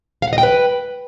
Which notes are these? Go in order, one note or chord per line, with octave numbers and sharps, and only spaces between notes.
F5
F#5
D#5
G5
B4